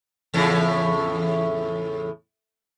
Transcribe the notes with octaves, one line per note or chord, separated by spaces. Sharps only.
E2 A2 C#3